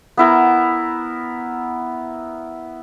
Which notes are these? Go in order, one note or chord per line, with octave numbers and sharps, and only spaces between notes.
B3 E4 A#4